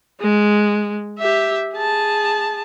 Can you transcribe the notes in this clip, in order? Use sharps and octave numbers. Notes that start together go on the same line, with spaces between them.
G#3
G4 E5
G#4 A5